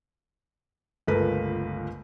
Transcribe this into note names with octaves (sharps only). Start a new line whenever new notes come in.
G1 C#2 A3 A#4 B4